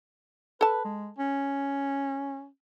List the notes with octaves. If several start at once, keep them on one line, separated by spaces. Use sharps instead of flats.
A4 B4 A5
G#3
C#4